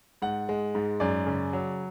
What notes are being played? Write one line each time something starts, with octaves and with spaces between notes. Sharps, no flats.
G#2 F#5
G#3
G#2
F#2 D5
C#3
F#3